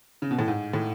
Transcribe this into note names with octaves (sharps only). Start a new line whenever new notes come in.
C#3
B2
A2
G#2
A2